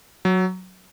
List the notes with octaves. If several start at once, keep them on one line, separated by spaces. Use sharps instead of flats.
F#3